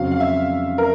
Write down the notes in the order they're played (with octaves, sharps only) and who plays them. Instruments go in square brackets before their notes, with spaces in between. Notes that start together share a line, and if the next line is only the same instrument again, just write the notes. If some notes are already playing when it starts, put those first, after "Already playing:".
Already playing: [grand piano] F2 C#3 F#3 [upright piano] F5
[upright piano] F5
E5
A#4